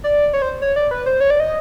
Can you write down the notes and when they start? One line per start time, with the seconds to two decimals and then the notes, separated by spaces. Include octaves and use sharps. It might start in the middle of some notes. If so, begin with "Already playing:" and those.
0.04 D5
0.33 C#5
0.42 C5
0.62 C#5
0.76 D5
0.91 B4
1.06 C5
1.20 C#5
1.30 D5
1.40 D#5